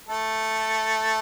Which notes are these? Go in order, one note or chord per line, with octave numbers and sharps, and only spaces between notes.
A3 A4